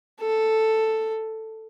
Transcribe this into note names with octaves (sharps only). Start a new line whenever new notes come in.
A4